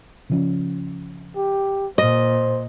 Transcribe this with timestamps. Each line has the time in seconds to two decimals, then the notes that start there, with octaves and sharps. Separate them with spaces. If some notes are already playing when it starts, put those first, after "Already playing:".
0.30 C#3 F3 C#4
1.36 G4
1.98 A#2 C5 D#5